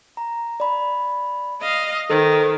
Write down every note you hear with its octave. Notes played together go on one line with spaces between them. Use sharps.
A#5
D5 B5
D#5 F5
D#3 A4 C5